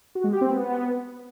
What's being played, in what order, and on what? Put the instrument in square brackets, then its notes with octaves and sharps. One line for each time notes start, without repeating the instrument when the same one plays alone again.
[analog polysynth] F#4
G#3
G4
C4
B3